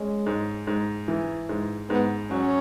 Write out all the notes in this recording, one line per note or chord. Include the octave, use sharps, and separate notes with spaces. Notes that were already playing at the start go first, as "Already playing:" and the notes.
Already playing: G#3 C#4
G#2
G#2
E3
G#2
G#2 B3
F#3 C#4